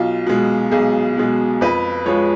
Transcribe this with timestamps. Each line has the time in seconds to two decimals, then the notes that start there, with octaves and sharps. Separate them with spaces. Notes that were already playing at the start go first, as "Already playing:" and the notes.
Already playing: B1 F4
0.27 B2 G#3
0.71 B1 G#4
1.17 B2 G#3
1.61 F2 B4
2.06 F3 G#3 C#5